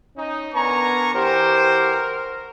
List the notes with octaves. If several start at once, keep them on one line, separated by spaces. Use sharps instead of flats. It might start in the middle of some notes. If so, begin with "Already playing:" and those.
C#4 D#4
B3 D4 A#4 G#5 A#5 C#6
E3 F#4 G4 A#4 C5